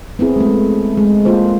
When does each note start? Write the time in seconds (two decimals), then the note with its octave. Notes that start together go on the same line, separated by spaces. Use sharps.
0.19 B3 C4 E4 G#4
0.36 G#3 A3
0.97 G#3
1.25 A#3 F4 A4 C5